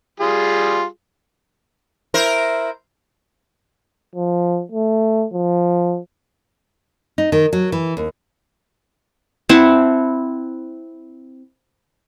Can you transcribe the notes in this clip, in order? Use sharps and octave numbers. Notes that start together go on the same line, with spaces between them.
G3 F4 G#4
E4 A#4 C5
F3
A3
F3
D#4
D#3
F#3
E3
D#2
C4 E4 F#5 A5